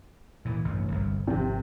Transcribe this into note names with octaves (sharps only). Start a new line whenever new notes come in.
A#2 E3
A1 G2 C3
G1 C2 F#2
G#1 C3 F3